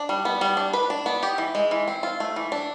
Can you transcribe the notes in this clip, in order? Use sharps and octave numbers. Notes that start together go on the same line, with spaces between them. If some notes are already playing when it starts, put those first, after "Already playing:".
Already playing: D4
G3
B3
G3
D4
B4
D4
B3
G4
E3
G#3
E3
C4
F4
A3
E3
D4